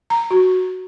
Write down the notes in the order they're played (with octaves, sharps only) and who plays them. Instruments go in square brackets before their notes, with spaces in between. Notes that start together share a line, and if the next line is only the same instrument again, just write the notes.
[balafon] A#5
F#4